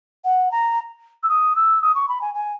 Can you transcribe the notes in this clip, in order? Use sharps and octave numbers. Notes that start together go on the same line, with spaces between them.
F#5
A#5
E6
D#6
E6
D#6
C#6
B5
G#5
G#5